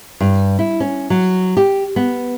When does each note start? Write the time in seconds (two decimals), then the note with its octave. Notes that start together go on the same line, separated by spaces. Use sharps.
0.20 G2
0.59 E4
0.80 C#4
1.10 F#3
1.57 G4
1.96 B3